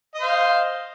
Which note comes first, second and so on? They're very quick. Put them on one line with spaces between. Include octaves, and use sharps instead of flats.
D#5 C5 F5